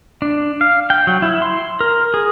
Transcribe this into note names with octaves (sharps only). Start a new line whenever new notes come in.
D4
F5
G5
F#3
E4
C6
A#4
G#4